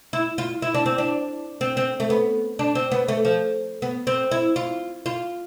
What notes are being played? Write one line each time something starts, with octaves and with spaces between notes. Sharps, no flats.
E4
F4
E4
D4
C4
D4
C4
C4
A3
B3
D4
C4
B3
A3
F3
B3
C4
E4
F4
F4